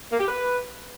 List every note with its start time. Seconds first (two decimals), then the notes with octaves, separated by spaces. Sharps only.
0.11 A#3
0.20 G4
0.28 B4